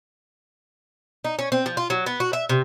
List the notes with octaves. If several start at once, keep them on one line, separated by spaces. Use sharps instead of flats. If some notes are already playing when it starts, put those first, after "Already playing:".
D#4
C#4
C4
F3
F4
F#3
B3
F#4
E5
C3